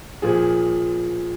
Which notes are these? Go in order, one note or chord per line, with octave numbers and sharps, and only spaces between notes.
A#2 F3 G#4